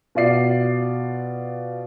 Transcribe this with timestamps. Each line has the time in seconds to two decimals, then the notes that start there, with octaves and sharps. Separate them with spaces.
0.15 B2 F4 D5 C7